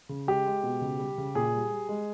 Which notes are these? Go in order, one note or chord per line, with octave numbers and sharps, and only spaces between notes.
C#3
G#3 G4
G#3
B2
C#3
G3
C#3
A#2 G#4
G3
G3
G#3